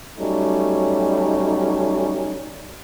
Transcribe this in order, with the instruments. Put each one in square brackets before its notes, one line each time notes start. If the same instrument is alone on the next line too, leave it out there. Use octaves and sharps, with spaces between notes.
[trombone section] F#3 G3 A3 C#4 D#4